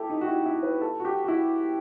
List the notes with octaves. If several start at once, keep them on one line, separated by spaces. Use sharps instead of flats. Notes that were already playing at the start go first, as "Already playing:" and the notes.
Already playing: E4 G4 A4
D#4
F#4
E4
E4
B4
A4
F#4
G4
F#4
E4